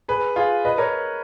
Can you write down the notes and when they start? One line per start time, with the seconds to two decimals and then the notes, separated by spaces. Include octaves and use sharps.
0.08 G#4 B4
0.36 F4 G#4
0.65 B4 D#5
0.78 A#4 C#5